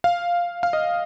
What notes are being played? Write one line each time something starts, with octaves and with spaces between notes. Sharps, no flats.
F5
F5
D#5